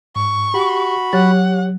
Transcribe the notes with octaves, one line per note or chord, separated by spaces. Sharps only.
G#2 C#6
F#4 G4 B5
F#3 G4 C#5 F#5